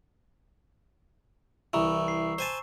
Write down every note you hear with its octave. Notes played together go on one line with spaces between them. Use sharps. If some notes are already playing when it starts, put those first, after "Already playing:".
C2 E3 A#5 C#6 E6
C7
C5 G#5 A5